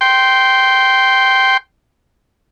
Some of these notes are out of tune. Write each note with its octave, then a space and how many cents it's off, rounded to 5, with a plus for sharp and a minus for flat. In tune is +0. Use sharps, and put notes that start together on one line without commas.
G5 -10 C6 +0